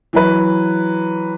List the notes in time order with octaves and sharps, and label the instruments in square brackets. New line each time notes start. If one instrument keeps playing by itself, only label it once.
[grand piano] E3 F#3 B4